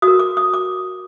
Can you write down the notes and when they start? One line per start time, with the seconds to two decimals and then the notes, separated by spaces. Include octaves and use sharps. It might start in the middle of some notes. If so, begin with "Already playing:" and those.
0.02 F#4 D#6
0.07 A#4
0.19 D6
0.37 D#6
0.54 D6